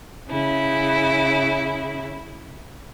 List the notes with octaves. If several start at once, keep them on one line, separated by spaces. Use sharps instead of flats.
C#3 E4